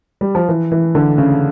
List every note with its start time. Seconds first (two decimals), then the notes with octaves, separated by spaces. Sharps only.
0.21 G3
0.35 F3
0.49 E3
0.72 E3
0.95 D3
1.18 C#3